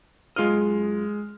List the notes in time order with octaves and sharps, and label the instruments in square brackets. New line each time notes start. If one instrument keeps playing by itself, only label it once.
[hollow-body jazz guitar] F#2 F4 D#5 [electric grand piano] G#3 F6